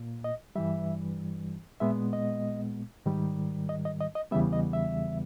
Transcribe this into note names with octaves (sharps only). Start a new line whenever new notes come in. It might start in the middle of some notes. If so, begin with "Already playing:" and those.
Already playing: A#2 A#3
D#5
G2 E3 G3 E5
A#2 G#3 B3 E5
D#5
G#2 D#3 G3
D#5
D#5
D#5
D#5
E2 C#3 E3 G3 B3 E5
D#5
E5